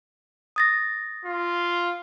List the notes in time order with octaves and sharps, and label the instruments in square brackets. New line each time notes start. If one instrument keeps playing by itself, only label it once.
[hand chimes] D#6 A6 A#6
[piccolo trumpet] F4